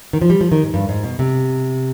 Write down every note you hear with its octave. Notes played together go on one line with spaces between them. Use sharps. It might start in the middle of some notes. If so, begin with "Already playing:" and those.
D#3
F3
G3
F3
D#3
G#2
G2
G#2
B2
C3